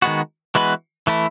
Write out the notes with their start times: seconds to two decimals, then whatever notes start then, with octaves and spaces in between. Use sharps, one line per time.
0.02 D#3 G#3 B3 F#4
0.55 E3 G#3 B3 F#4 B4
1.07 E3 A3 E4